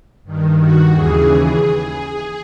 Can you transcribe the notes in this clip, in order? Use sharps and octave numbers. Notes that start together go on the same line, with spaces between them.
G2 D#3
F#4
D#2 C#3 E3 G#4